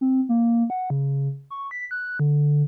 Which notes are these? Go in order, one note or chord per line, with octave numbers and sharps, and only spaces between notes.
C4
A#3
F#5
C#3
C#6
B6
F#6
D3